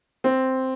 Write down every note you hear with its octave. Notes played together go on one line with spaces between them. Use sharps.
C4